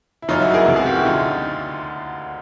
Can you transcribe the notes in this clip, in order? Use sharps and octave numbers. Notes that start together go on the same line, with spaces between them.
E4
G1 F#2 C#3 E3 D#4 F4
E4 F#4
G#4 A#4
C#2 C3 E3
F#4 G#4
F4 G4
E4 F#4
D2 D3 D#4 F4